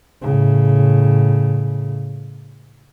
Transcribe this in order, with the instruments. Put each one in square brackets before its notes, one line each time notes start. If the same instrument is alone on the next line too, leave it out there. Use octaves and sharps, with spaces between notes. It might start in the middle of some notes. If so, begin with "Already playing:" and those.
[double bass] A2 C#3